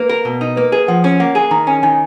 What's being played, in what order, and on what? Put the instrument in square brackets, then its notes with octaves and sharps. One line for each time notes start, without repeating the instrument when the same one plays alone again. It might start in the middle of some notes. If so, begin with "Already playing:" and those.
Already playing: [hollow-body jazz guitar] A#3 [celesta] B4
[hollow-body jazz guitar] A#4
B2
D#4
[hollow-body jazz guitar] A#3 [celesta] B4
[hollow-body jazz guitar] G#4 [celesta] B4
[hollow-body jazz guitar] F3 [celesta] F#5
[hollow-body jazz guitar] C#4
[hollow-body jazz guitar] A#3 [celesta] F#5
[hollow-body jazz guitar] G#4 [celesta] G#5
[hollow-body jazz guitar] D#3 [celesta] A#5
[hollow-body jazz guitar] C#4 [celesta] G#5
[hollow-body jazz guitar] D#3 [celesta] G#5